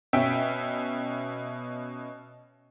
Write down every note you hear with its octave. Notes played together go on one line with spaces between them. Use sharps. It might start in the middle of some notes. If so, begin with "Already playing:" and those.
B2 C#4 E5 G5